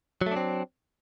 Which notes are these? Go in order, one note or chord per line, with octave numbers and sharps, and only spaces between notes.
F#3 A3 C4 D4